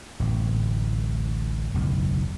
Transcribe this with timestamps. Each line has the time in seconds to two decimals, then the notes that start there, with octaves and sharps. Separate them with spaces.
0.20 D1 A1
1.74 F#1 B1 E2